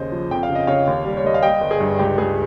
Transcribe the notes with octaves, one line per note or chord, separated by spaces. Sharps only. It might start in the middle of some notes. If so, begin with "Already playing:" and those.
Already playing: D#2 C#3 C5 D#5
F3
F2 G5
F5
C#3
D#5
C#3 C#5 F5
D#2
G3
C#5
D#2 D#5
F5
G3 D#5 G5
G1
G#4
G2
C#2 G4
C#2 G#4